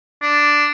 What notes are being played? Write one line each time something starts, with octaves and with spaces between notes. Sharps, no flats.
D4